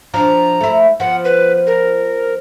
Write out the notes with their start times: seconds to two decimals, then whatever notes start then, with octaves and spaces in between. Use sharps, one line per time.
0.14 F3 D4 A#5
0.61 A3 E4
1.00 F3 B3 F#5
1.25 B4
1.67 A#4